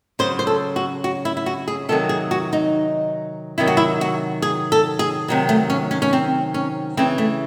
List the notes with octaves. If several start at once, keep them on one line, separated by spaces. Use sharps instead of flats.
C#3 F#3 C5
C5
A4
F#4
F#4
E4
E4
F#4
G#4
C3 D#3 F#3 A4
G#4
F#4
D#4
C3 D#3 F#3 E4
F#4
E4
F#4
G#4
A4
G#4
C3 D#3 F#3
A3
C#4
C#4
C#4
C4
C#4
C#3 E3 C4
A3